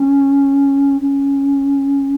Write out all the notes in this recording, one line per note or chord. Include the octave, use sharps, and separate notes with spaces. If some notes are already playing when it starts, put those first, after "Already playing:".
Already playing: C#4
C#4